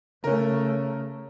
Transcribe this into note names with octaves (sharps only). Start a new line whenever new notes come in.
C#3 A3 C#4 A#4